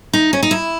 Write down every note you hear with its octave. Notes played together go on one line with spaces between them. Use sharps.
D#4
C#4
D#4
E4